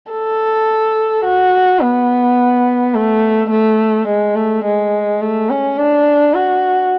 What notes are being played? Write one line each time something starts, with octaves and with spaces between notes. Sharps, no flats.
A4
F#4
B3
A3
A3
G#3
A3
G#3
A3
C#4
D4
F#4